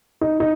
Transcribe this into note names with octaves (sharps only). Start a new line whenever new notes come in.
D#4
D#4